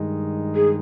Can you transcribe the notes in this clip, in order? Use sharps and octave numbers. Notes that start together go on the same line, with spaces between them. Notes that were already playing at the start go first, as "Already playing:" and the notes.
Already playing: G2 D#3 G#3 D#4
G#4